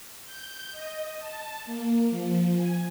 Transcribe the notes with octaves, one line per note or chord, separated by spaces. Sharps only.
G6
D#5
A5
A#3
F3
G#5